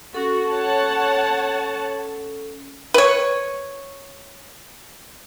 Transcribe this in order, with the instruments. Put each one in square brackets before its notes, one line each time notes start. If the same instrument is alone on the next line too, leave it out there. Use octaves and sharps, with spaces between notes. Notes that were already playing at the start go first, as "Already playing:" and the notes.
[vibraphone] C#4 A4 [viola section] F#4
[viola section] C#5 F#5 A5
[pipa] B4 C#5